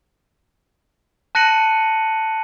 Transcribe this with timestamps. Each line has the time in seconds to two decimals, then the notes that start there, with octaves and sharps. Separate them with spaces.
1.35 A5 F#6 A#6 C#7 D#7 F#7